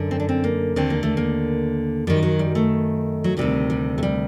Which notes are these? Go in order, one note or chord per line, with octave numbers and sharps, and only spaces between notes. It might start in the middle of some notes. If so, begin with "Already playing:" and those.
Already playing: F#2 D3
C4
D4
C4
A#3
D#2 D3 C4
A#3
A3
A#3
F#2 D#3 G3
F#3
G3
A3
F#3
D2 C3 D#3 G3
G3
A3
G3